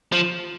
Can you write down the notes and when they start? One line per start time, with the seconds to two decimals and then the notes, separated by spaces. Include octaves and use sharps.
0.12 F3